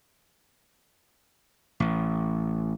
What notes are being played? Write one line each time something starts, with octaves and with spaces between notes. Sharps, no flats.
A1